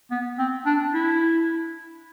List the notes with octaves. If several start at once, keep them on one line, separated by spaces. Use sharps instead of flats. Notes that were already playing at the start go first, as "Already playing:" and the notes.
B3
C4
D4
E4